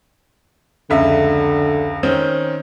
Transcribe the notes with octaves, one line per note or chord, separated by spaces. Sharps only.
F1 C#2 D3 E5
D#3 C4 C#4